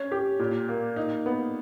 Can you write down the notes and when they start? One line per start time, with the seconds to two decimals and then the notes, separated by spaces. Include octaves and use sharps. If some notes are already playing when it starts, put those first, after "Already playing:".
Already playing: C#4 C#5
0.12 G4
0.39 A#2
0.69 A#3
0.96 D#4
1.26 B3